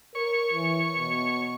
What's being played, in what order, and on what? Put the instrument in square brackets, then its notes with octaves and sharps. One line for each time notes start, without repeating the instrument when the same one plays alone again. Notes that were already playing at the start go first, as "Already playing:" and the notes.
[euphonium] A#4 [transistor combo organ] C#5 C#6
[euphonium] E3
B2